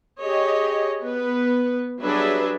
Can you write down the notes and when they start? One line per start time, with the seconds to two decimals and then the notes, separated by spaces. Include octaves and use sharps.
0.20 G4 G#4 C#5 D#5
1.02 B3 B4
2.01 F#3 G3 D4 G#4 B4 E5